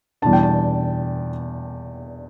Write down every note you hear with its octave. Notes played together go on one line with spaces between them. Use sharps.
E2 B2 G3 D4 A5
G5
A5